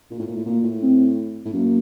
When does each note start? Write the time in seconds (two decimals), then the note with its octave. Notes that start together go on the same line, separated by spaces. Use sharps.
0.11 A#2
0.19 A2
0.28 A#2
0.37 A2
0.46 A#2 A#3
0.63 A2
0.82 C4
1.46 A2
1.53 F#2 A#3